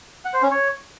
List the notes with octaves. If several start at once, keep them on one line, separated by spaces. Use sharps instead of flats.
F#5
C5
C#4
C#5